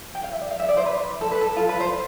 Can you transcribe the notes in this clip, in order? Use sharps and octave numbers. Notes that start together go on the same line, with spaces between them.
G5
F5
E5
D5
F5
E5
D5
C5
B4
A4
B4
A4
F4
B4
C5